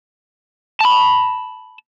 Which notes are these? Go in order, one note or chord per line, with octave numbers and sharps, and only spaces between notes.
A5 B5